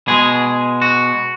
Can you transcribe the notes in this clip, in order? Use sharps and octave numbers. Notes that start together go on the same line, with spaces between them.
B2 G#3 G#4
F#4